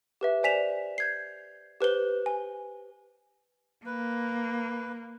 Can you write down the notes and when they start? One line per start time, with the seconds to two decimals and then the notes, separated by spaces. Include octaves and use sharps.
0.21 G4 B4 E5
0.43 C5 D5 G#5 B6 E7 F7
0.98 G6 G#6 C7
1.81 G4 B4 C5 G7
2.26 G#5
3.86 A#3 B4